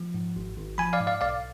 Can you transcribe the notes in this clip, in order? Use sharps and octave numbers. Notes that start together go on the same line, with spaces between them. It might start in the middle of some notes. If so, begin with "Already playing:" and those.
Already playing: F3
G#2
G#1
G#1
F3 G#5 B5
D5 F5
G#2
D5 F5
B1 D5 F5